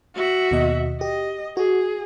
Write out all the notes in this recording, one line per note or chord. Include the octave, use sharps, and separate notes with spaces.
F#4 E5
D#2 B2 D#5
G4 D#5
F#4 G#4